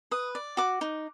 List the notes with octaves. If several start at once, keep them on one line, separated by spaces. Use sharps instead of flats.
B4 D#6
D5
F#4 D6
D#4